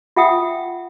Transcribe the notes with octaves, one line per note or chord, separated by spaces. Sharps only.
F4 E5 F#5 G5 D#6